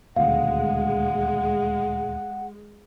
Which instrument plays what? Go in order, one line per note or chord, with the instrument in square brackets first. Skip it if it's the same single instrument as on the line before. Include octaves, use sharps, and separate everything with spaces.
[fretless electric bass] D#1 D2 B2 [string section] G#3 [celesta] F5 [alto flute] F#5